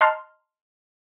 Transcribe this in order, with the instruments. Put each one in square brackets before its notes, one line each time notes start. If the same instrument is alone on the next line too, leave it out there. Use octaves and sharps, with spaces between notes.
[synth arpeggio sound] D#5 A5 A#5 C6 F6